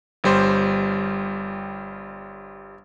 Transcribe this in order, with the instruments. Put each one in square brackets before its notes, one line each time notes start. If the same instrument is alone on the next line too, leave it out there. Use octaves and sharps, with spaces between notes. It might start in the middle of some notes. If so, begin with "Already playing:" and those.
[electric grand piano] G1 G3 C5